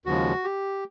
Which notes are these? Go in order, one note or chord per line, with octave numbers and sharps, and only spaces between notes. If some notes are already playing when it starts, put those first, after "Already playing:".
D#2 C#3 F3 G#3 F#4
G4